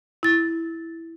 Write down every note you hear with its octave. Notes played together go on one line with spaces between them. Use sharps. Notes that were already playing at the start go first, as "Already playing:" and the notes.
E4 A6